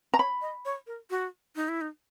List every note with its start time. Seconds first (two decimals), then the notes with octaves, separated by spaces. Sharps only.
0.14 A#5
0.18 C#5 B5
0.42 D#5
0.65 C#5
0.87 A#4
1.10 F#4
1.56 D#4
1.69 E4
1.81 D#4